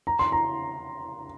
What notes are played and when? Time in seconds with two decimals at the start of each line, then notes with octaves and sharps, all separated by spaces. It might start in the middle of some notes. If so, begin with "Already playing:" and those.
0.07 A#5
0.19 C6
0.32 A#5